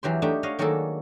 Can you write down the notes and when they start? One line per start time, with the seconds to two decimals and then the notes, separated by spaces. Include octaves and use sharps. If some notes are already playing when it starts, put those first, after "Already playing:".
0.03 E2 E3 F#3 G4 C6
0.22 A3 D4 D#4 G4
0.43 C#5 D#5 F5 F#5
0.59 D#3 F#3 A#3 D4 G#4 A4